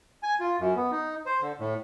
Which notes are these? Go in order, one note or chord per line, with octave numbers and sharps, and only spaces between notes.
G#5
F4
F#2
B3
D#4
C5
D3
A2